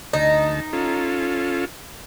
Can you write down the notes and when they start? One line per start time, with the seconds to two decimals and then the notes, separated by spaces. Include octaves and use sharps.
0.13 D2 D#4 A5
0.73 C#4 F4 A4